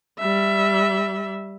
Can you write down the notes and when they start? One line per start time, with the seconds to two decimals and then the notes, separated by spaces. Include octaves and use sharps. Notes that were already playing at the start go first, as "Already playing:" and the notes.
0.20 G3 E5